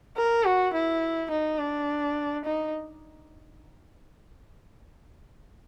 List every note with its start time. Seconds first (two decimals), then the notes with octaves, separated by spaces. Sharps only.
0.16 A#4
0.45 F#4
0.73 E4
1.31 D#4
1.59 D4
2.45 D#4